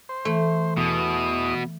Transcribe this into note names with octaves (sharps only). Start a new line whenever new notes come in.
C5
E3 A3
E2 B2 D#6